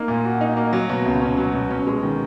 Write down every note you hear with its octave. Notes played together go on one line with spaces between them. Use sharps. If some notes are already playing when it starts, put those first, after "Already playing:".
Already playing: A#3 D#4
A#2
F#4
D#4
A#3
F#3
B2
C#2
C#4
F#3
B2
C#4
G#3
D#3